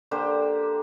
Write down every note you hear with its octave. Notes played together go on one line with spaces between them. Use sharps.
D3 A#3 G4 C5